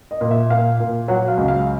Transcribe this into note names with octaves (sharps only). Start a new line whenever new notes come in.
D#5
A#2
E5
A#2 F5
A#2
F#3 F#5
F5
C#2
F5